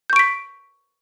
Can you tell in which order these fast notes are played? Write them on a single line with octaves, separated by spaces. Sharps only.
G6 C#6 D7 B6